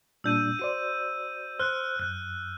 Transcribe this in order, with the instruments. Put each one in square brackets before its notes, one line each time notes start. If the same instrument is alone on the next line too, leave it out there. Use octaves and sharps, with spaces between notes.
[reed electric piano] A#2 G3 D4 [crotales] E6 G6 D#7
[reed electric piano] F#4 C5 D5 [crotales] D#7
[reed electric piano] C5 [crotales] F6 F#6
[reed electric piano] F#2 [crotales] F#6